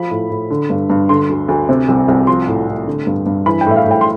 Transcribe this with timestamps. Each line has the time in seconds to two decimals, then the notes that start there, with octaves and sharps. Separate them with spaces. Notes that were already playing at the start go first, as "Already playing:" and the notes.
Already playing: F3 B5
0.11 A2
0.30 A2
0.50 D3
0.70 G2
0.90 G2
1.09 D3 C6
1.30 D2
1.48 D2
1.69 C3
1.88 C2
2.08 C2
2.27 F3 C6
2.48 A2
2.68 A2
2.87 D3
3.07 G2
3.26 G2
3.46 E3 B5
3.61 G5
3.66 A2 E5
3.76 F5
3.86 A2 G5
4.01 C6